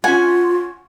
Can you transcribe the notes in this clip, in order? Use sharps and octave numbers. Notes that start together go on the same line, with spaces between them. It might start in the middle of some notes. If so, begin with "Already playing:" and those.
C#4 F4 F#5 G#5